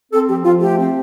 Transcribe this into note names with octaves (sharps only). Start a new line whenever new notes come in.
C4 A4
F3 G4
F3 F4
A3 G4
C4